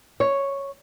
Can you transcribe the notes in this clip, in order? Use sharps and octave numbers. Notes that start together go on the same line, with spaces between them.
C#5